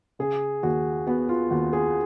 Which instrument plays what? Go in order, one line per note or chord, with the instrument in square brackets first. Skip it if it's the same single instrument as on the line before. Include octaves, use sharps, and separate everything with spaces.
[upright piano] C#3 [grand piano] G#4
[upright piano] D#2 [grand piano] F#4
[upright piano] B3 [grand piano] F#4
[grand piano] F4
[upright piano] D#2 [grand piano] F#4
[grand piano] G#4